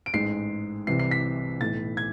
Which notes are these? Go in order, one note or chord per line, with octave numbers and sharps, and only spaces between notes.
D7
A1 G#2 G#3 C7
C2 C3 E3 C7
C7
B6
B1 A2 E3 A6
G#6